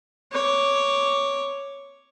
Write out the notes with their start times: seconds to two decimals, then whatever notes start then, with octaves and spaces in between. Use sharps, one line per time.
0.32 C#5 D6